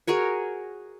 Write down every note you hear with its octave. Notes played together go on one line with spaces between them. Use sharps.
F#4 G#4 A#4 C#5